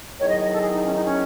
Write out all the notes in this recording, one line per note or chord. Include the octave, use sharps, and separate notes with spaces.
E2 D#3 F#3 C#5
D#5
D#5
A4
G#4
D#4
C#4
D#4
C#4